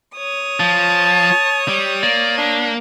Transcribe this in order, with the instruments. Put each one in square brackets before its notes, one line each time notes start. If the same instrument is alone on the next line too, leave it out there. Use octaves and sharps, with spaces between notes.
[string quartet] C#5 D#6
[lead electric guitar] F3 [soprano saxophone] A5
[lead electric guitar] G3
[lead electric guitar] A#3 [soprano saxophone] D5
[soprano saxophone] D4